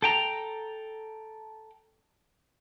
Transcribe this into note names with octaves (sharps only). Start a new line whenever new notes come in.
A4 G5 A#5